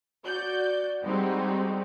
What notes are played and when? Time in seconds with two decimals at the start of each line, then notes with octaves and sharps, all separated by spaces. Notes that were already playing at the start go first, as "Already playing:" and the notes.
0.24 F#4 D5 G6
1.02 G3 G#3 C4 D#4 F#4 G4